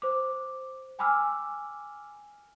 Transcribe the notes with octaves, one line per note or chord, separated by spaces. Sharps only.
C5 D6
G5 G#5 B5 D6 E6 F6